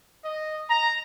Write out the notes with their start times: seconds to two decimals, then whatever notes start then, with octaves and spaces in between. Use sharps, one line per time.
0.23 D#5
0.70 A#5